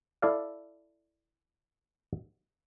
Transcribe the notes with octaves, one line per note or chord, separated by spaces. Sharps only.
E4 A4 D5 F5